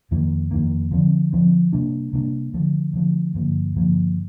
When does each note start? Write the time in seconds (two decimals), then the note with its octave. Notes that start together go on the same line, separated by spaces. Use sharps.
0.11 F2 D#3 A#3
0.51 F2 D#3 A#3
0.91 D3 F3 C4
1.33 D3 F3 C4
1.73 C3 G3 A#3 D4
2.13 C3 G3 A#3 D4
2.54 D3 F3 A3
2.93 D3 F3 A3
3.34 G2 D3 F3 A#3
3.75 G2 D3 F3 A#3